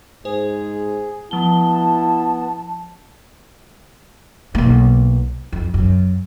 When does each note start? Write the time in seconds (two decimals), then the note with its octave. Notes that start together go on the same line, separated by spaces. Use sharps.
0.25 G#2 G#4 C5
1.31 F3 B3 E4 A5 G7
4.55 B1 A#3
5.53 F2
5.74 F#2